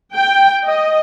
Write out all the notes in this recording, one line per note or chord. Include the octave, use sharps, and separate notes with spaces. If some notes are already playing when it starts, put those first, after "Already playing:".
G5
D#5